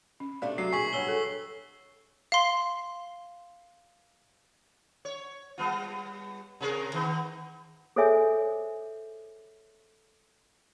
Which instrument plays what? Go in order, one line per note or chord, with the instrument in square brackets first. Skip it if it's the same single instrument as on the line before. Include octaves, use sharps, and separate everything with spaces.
[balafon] C#4
[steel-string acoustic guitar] C3 A3 D4 [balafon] D5 F5
[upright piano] F#3 [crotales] C7
[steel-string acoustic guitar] A#2 [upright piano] G#4 [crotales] C#6 B6 F#7
[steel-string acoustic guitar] G2 C#3 F#3 [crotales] E6 G7
[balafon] A4
[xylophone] F5 C6
[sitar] C#5
G3 B3 F4
C3 G#4 A#4
D#3 B3
[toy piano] G#4 A4 C5 C#5 E5 G#5